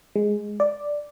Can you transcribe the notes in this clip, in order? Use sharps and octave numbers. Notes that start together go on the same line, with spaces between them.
G#3
D5